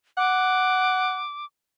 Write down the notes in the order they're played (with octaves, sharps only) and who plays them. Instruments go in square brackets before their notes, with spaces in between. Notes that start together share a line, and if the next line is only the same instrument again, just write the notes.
[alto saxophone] F#5 [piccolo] D6